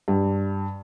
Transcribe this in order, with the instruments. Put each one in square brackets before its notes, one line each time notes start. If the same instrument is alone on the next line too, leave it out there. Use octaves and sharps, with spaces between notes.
[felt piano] G2